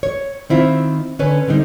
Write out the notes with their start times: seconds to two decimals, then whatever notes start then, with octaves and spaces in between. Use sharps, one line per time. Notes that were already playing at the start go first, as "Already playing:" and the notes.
0.03 C#5
0.50 D#3 C4 E4 F4
1.19 D3 C#4 B4 C#5
1.48 D3 G3 C4 D#4